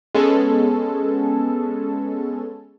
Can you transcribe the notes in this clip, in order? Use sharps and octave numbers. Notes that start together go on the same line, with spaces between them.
G#3 B3 C#4 A4